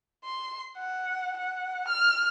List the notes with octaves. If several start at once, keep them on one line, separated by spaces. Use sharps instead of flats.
C6
F#5
F#5
F6